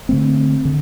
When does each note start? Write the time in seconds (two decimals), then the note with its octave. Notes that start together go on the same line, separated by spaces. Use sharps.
0.09 D3 A3 C4
0.65 D3